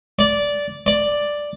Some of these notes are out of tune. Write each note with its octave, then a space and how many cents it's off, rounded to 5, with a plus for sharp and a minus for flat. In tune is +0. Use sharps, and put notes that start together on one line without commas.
D5 -15
D5 +0